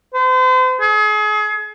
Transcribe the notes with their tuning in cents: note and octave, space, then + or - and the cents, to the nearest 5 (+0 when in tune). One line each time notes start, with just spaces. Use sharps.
C5 -40
G#4 +35